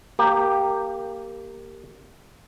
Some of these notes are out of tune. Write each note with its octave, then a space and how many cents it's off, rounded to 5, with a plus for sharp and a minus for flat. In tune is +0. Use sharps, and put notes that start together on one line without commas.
A#3 -15 G4 +0 A#4 +0